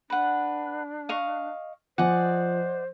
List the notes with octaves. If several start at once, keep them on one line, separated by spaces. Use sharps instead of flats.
D4 B4 F#5
D#5 F5 C#6
F3 C5 D5 D#5 F#5 G#5